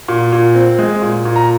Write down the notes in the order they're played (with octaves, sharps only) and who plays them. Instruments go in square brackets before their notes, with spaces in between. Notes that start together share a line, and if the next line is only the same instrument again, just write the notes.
[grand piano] A#2
A#2
C4
G#3
A#2
A#2
A#5